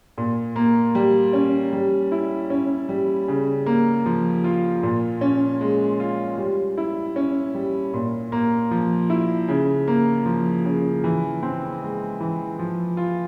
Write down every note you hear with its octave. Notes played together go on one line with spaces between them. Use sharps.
A#2
A#3
G3
C#4
G3
E4
C#4
G3
C#3
A#3
F3
F4
A#2
C#4
G#3
F4
G3
E4
C#4
G3
A#2
A#3
F3
E4
C#3
A#3
F3
C#3
E3
C4
G#3
E3
F3
F4